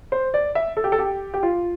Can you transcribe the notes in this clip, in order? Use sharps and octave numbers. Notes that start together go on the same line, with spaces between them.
C5
D5
E5
A4
G4
A4
G4
G4
F4